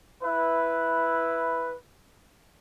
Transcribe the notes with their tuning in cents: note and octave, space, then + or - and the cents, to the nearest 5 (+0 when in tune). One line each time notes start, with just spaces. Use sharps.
E4 +0 B4 +0